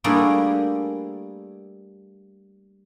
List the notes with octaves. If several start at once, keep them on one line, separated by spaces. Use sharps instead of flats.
G3 A3 A#3 D4 E4 G#4